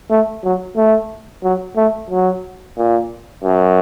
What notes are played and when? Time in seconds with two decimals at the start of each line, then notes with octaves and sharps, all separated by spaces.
0.10 A3
0.44 F#3
0.77 A3
1.44 F#3
1.77 A3
2.10 F#3
2.77 A#2
3.44 F#2